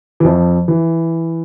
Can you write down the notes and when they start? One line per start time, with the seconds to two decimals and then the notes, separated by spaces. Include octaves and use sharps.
0.20 E3
0.24 F2 F3
0.68 E3